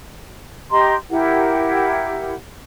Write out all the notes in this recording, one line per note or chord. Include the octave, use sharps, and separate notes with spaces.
G4 D#5 A#5 C6
E4 G4 A#4 F#5